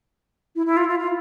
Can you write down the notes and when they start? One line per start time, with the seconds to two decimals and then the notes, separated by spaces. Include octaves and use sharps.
0.55 E4
0.66 E4
0.77 F4
0.88 F4
0.99 F4